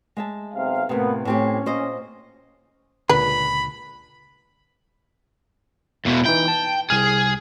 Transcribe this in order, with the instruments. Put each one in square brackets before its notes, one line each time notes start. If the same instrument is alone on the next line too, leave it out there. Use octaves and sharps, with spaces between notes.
[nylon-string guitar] G#3 E5 A5
[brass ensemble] B1 C3 F5
[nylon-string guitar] A2 C3 [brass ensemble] A#3 B3
[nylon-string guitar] A2 C4 G4 [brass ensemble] C#4
[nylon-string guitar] A#2 C5 D#5
[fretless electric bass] C#2 A#2 D3 [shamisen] B4 [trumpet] B5
[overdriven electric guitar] E2 B2
[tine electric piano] E3 D#4 E4 [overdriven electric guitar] G5
[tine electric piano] A5
[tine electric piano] C2 F6 [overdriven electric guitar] G#4